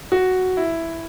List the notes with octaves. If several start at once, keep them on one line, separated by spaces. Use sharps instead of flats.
F#4
E4